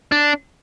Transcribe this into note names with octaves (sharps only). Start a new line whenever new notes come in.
D4